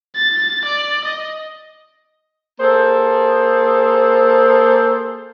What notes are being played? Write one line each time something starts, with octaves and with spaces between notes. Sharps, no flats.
A6
D5
D#5
A#3 G#4 A4 C5